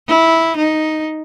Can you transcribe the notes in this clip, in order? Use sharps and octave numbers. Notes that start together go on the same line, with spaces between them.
E4
D#4